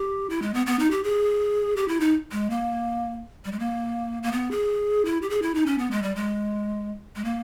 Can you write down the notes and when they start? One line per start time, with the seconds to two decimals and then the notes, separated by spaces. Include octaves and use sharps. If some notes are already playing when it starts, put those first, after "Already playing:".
Already playing: G4
0.30 E4
0.42 G#3
0.54 B3
0.66 B3
0.79 D#4
0.91 G4
1.03 G#4
1.76 G4
1.88 E4
2.00 D#4
2.32 G#3
2.50 A#3
3.45 G3
3.52 G#3
3.59 A#3
4.23 A#3
4.32 B3
4.51 G#4
5.05 E4
5.22 G4
5.30 G#4
5.42 E4
5.55 D#4
5.66 C#4
5.78 B3
5.91 G#3
6.03 G3
6.16 G#3
7.16 G#3
7.25 A#3